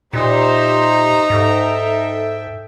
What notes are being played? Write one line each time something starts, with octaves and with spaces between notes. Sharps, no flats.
A#2 D#4 G4 C5 E5 A#5
G#2 A4 E5 G5